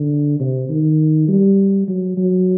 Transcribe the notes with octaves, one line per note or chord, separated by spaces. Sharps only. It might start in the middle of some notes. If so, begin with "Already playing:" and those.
Already playing: D3
C3
D#3
G3
F#3
F#3